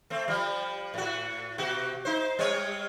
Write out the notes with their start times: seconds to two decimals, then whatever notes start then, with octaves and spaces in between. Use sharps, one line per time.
0.10 A3 C4
0.28 F3 G3
0.94 A2 F#4
1.58 B2 F#4 G4
2.05 D#4 C5
2.39 G3 C4 C#5